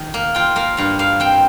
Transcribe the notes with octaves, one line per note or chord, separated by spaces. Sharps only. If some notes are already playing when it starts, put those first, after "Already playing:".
Already playing: D#3 D#4
A#3
F4 G5
A#3 F5
G2 F5
A#3 F5
C4 G5